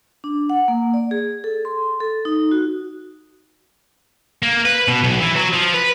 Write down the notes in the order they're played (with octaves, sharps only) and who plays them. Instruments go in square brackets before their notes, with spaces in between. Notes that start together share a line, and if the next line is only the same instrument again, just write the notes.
[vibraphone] D4
F#5
A#3
D5
G#4
A4
C6
A4
D#4
F#4
[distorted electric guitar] A#3
B4
B2
B1
E3
F#3
F3
B4